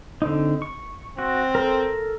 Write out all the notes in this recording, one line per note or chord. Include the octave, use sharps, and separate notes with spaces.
D3 C4 D#4
C#6
C4 F#4
A4 A#4